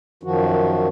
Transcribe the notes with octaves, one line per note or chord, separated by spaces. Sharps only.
F#2 D#3 F3 F#4